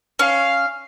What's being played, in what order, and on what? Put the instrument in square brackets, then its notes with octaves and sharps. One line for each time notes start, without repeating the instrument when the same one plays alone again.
[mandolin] C#4 [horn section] F5